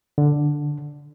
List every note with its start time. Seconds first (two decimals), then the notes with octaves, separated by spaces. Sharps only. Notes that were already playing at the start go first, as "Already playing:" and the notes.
0.18 D3